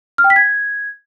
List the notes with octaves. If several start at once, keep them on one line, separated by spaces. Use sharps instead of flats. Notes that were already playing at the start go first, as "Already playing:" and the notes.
F6
G5
B6
G#6